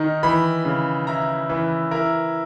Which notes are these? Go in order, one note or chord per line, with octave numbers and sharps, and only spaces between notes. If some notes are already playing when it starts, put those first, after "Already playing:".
Already playing: D#3 D#4
E3 B5
C#3
E4 A#5
E3 B4
E4 A#4